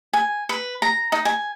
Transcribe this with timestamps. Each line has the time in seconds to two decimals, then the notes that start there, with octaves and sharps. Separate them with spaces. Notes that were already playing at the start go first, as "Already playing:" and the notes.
0.13 G#5
0.49 B4
0.82 A#5
1.12 D#4
1.25 G#5